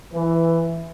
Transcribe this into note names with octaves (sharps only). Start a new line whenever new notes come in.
E3